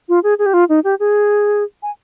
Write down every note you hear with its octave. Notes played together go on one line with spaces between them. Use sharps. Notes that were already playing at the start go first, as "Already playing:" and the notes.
F4
G#4
G#4
G4
F4
D#4
G4
G#4
G#5